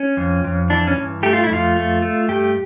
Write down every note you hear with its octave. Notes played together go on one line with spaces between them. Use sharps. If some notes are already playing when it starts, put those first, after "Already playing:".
Already playing: C#4
F2
F2
E3 D4
C#4
G2
A3 G4
F4
E4
F2 F4
A3
A3
G2 G4